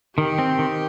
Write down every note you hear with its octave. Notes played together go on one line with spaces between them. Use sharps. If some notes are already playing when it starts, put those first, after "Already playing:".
D#3 G4
C4
D#3